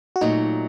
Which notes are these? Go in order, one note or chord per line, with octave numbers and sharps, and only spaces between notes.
F#4
A#2 F#3 A3 D#4